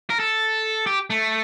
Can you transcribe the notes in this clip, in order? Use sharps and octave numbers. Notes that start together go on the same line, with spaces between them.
A#4
A4
G4
A3